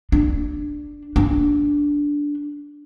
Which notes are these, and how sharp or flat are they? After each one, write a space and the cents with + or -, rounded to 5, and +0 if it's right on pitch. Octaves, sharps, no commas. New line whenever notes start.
D4 +5
D4 -10